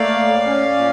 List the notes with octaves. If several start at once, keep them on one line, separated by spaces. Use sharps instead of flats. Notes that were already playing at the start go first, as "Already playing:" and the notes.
Already playing: A3 A#3 D5 F5
A2
C#4
A#2